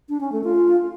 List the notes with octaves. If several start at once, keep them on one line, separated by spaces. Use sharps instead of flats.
D4
C#4
A3
F4